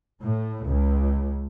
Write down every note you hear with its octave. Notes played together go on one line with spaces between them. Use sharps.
A2
C#2